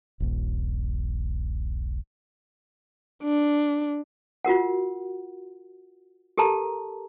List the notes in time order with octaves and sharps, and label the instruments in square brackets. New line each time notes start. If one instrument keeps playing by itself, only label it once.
[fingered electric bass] D#1 A#1
[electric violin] D4
[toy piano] F4 F#4 A#4 F#5
G4 A4 A#4 A5 A#5